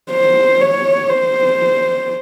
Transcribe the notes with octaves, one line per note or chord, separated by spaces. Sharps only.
C5
C#5
C5